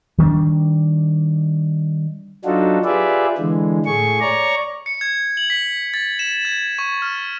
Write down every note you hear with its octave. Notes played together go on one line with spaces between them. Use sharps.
D#3 G3 B3 D4
F#3 D4 D#4 F4 F#4 A4
F4 G4 G#4 B4 D5 E5
D3 E3 G#3
A2 A3 G#4 C#6
C#5 D5 A#5 C#6
C#7
G#6
F#7
B6
A6
E7
G#6
C#6
F6